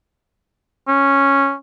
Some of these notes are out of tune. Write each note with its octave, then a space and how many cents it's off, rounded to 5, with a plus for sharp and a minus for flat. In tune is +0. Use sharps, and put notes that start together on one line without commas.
C#4 -5